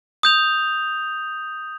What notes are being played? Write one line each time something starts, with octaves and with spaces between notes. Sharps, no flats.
D#6 G6 F7